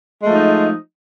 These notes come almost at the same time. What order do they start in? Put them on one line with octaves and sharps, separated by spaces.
G#3 A3 F3 D#4